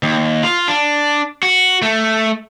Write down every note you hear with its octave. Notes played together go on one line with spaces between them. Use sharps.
D#2
F4
D4
F#4
A3